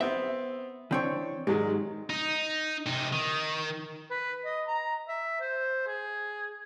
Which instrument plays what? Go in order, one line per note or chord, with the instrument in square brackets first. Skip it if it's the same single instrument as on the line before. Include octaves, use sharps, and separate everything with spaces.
[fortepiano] B3 C4 [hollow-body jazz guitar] E5
[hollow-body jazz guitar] E3 C4 C#5 [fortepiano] D4 G5
[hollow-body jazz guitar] G#2 [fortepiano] D#3 F#3 G#3
[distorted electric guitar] D#4
C3 D#4
D#3
[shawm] B4
D#5
A#5
E5
C5
G#4